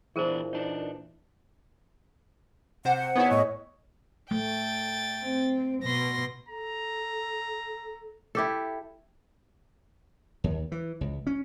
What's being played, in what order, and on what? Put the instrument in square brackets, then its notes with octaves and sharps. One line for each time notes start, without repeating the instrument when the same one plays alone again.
[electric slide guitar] E2 D4 [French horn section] A#2 E3 [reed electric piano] E4 [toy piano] G#4 A#4 C5
[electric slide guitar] D4 D#4
[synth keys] C3 C5 [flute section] F#5
[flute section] F#5
[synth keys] B3 D#4 E4 [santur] G#4 C#5
[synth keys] A2 [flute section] D#5 C#6
[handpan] A3 [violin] G5 A6
[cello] C4
[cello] B2 [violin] C6 A#6
[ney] A4 [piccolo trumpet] A#5
[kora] E4 G4 A4
[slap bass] D#2
E3
C#2
C#4